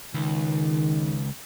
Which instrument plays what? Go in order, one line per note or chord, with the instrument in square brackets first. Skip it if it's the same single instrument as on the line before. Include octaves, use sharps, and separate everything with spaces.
[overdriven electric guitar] C#2 [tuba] D#3